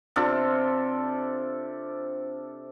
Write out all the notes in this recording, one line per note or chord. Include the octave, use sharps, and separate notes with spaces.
C3 D4 F4 A4